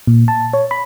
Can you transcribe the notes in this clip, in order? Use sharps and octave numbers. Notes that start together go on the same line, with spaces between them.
A#2
A5
C#5
B5